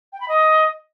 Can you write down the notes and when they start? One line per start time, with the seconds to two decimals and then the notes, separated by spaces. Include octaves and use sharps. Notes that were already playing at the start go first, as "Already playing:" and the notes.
0.13 G5
0.20 B5
0.28 D#5